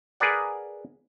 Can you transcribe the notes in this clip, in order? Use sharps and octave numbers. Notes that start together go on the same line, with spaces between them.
G#4 A#4 B4 D5 F#5